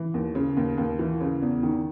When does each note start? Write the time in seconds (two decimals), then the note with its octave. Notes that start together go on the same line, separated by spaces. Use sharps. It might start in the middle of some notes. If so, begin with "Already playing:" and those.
Already playing: E3
0.14 D#2
0.35 C#3
0.57 D#2
0.78 D#2
0.99 E3
1.21 C#3
1.42 E2
1.63 D#3